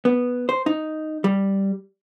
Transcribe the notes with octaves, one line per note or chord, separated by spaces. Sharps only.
B3
C5
D#4
G3